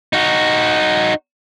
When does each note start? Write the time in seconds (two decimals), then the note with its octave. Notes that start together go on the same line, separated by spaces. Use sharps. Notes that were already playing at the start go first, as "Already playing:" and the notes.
0.13 D#4 F#4